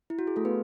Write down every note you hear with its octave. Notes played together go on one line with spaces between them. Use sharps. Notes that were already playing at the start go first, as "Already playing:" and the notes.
E4
F#4
G#4
A3 A4
B3 B4